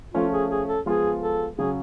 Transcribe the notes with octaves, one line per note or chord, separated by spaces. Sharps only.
F3 A3 C#4 F4
G#4
G#4
A4
F3 G#3 B3 F4 G#4
A4
C#3 F#3 C#4 G#4